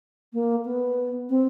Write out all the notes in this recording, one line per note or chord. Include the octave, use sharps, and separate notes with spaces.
A#3
B3
C4